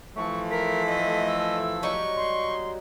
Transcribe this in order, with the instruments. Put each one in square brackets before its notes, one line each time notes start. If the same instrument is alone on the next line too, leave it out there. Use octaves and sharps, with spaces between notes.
[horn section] E3 F3 A3 [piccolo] C#6
[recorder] A#4 [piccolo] B6
[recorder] D#5
[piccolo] E6
[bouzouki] F#3 G3 D#4 [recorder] C#6
[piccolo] C6